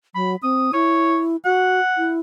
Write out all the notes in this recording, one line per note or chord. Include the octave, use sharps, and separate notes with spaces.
F#3 B5
C4 D#6
E4 C#5
F#4 F#5
E4